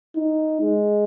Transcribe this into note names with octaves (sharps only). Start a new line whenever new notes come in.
D#4
G#3